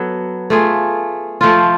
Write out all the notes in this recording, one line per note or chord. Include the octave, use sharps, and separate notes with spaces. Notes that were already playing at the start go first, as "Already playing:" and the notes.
Already playing: F#3 B3 A4
A3 F4 G#4
F3 A3 F4